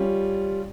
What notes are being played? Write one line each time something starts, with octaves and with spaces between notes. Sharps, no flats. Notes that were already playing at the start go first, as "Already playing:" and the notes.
Already playing: G3 C#4 F4